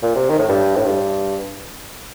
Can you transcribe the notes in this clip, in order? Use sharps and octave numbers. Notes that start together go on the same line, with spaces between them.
A#2
C3
D#3
A2
G2
A2
G2